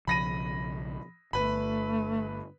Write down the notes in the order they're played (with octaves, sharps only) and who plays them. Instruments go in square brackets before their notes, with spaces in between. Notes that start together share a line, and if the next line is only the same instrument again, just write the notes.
[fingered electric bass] B1 C#3 F3 [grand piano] B5 A#6 D#7
[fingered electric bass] G1 [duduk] A3 [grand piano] B4 B5